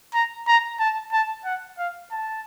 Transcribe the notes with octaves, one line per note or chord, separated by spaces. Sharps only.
A#5
A#5
A5
A5
F#5
F5
A5